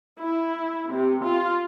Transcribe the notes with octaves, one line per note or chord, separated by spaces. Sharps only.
E4
C3
F4